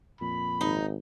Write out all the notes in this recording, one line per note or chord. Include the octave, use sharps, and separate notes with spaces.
F2 A#2 B5
G#1 D#4